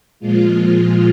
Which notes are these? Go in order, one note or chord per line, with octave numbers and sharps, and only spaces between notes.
A#2 F3 G#3 F4